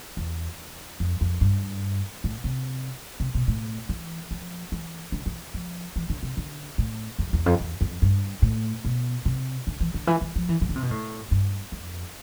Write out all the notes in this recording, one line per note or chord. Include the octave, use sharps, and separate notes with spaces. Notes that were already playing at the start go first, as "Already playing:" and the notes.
E2
F2
F2
G2
A2
C3
C3
B2
A2
E3
F3
E3
D3
E3
F3
E3
D3
C3
D3
A2
F2
E2
F2
E2
F2
G2
A2
B2
C3
D3
E3
D3
E3
E3
F3
E3
E3
D3
C3
B2
A2
G2
F2